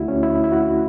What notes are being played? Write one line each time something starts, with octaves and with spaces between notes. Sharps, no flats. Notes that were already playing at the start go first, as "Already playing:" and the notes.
Already playing: D2 D3 A3 D4 E4 F#4
C#4
E4
E4
F#4